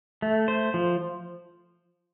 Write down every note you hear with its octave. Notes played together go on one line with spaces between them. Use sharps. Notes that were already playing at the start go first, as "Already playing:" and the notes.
A3
C5
F3